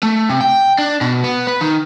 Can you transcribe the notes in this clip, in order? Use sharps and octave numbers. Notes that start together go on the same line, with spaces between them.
A3
C3
G5
D4
B2
B3
B4
D#3